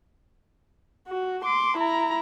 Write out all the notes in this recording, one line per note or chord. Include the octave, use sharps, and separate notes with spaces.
F#4
C6 D6
E4 A#5